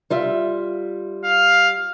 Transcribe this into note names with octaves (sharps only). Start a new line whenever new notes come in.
G3 F4 E5
F5